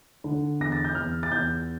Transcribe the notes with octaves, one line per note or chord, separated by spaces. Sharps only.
D3
E2 A#6
A6
G6
E2 F6
A6
E2 G6